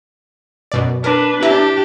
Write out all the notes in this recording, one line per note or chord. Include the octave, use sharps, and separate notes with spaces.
F#2 B2 D5
D4 A#4 B4
D4 E4 G4 E5 A#5